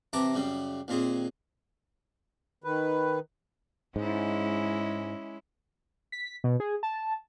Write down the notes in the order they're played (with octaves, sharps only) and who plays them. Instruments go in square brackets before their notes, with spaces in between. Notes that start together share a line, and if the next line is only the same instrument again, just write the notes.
[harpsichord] C3 E3 A5 A#5 D6
F#2 C#3 G3
D#2 A#2 C4 G#4
[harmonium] D#3 B4
[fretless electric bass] G#2 [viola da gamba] G#3 C#4 E4
[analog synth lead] B6
B2
G#4
A5